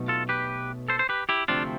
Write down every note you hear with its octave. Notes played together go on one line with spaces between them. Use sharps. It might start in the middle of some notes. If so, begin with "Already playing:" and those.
Already playing: B1 B2 A3
F4 A4
G4 B4
A4 C5
C5
G4 B4
E4 G4
D2 C3 F3 A3 C4 D4 F4